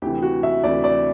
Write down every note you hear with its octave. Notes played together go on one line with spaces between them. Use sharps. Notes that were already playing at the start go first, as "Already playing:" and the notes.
D2 C3 E3 G4
F#4
E5
D2 C3 E3 D5
D5